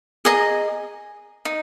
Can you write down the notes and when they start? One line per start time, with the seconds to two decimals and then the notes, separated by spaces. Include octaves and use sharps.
0.25 G#4 D#5 A#5
1.45 D#4